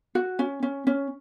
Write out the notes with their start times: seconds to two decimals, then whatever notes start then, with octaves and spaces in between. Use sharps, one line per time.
0.15 F#4
0.39 C#4
0.63 C#4
0.87 C#4